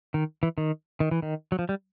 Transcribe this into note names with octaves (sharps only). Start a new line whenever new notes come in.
D#3
E3
D#3
D#3
E3
D#3
F#3
F3
G3